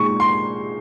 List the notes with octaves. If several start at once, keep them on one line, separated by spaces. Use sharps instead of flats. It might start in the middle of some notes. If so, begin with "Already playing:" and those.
Already playing: A#2 G#3 D#4 G#4 C#6
C6